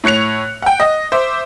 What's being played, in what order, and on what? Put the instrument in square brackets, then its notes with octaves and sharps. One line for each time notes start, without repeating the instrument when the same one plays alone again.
[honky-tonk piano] A2 C#5 F#6 C#7 F7
F#5 G5
D#5
C5 E5 D6